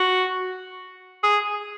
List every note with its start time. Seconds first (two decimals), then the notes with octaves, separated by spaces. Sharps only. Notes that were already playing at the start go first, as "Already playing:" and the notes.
Already playing: F#4
1.24 G#4